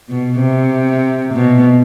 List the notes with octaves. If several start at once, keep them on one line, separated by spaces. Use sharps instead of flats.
B2
C3
B2